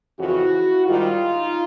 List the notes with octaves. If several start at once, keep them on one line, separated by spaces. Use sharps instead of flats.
F2 C#3 E3 E4 F#4
G#2 D#3 G3 D#4 F4